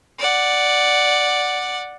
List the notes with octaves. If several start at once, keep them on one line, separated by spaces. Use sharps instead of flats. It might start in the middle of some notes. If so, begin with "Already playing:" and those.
D5 F#5